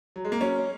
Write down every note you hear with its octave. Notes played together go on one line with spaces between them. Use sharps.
F#3
G#3
A#3
F#3 C#4